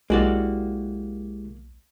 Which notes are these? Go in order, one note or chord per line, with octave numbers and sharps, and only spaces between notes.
B1 G#3 A#3 E4 F#4 G4 D5